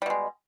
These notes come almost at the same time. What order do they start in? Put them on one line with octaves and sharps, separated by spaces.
G3 B2 G#3